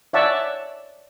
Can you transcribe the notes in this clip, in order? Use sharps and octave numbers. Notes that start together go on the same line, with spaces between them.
C#5 D5 E5 F#5 A5